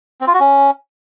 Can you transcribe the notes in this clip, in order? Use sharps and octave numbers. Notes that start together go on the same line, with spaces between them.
C4
F4
F#4
C#4